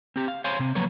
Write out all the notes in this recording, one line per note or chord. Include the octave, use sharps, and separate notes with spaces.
C4 G4
F5
C5 C#5 F5 G#5 C6
C3 C4
F3 F#3 A#3 B4 C#5